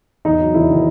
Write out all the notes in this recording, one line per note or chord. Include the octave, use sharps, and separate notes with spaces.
E2 D#4
F#3
E2 E4
D#3